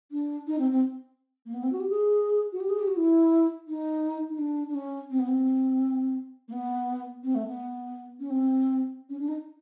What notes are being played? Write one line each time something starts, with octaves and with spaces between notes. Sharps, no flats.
D4
D#4
C4
C4
A#3
B3
C4
F#4
G4
G#4
F#4
G4
G#4
G4
F#4
E4
D#4
D#4
D4
D4
C#4
C4
B3
C4
A#3
B3
C4
A3
B3
C#4
C4
C#4
D4
D#4